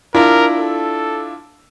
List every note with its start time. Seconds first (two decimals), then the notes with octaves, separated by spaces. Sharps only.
0.15 D4 E4 F4 A#4
0.59 A4